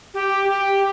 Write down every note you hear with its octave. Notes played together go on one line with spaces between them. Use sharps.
G4
G4